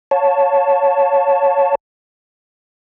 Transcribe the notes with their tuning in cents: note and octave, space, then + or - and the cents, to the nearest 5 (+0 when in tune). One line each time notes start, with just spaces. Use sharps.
C#5 +0 F5 +40 A5 +0